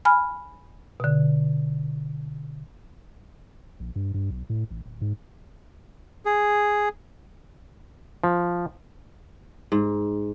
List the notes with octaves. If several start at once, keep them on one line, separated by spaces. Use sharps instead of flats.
G#5 B5 F6
B2 D3
A#1
G2
G2
B1
A2
A1
D1
G#2
G#4
F3
G#2